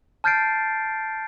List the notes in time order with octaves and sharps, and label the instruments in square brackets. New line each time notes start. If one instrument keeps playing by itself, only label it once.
[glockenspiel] A5 F6 G6 A6 C7 D7